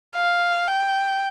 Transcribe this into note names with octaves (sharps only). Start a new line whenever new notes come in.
F5
G5